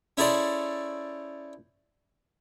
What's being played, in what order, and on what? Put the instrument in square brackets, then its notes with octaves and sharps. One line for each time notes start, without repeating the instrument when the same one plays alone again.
[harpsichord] C#4 E4 G#4 A4 C5 D5